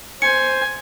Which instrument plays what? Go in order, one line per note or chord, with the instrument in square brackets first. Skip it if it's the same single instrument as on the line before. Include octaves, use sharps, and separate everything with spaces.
[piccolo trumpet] C5 [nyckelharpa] G#5 [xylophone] C#7